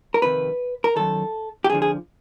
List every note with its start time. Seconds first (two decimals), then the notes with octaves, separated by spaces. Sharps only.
0.14 A#4
0.22 F2 C3 D#3 B4
0.84 A#4
0.96 F#2 D#3 A4
1.64 G4
1.70 F2 D3 F3 G#4
1.82 G#4